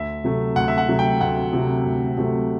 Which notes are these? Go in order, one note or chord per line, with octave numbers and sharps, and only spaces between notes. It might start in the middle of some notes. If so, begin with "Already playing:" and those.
Already playing: D2 E5
C3 F#3 A3
D2 F#5
E5
F#5
C3 F#3 A3
G5
D2 F#5
C3 F#3 A3
D2
C3 F#3 A3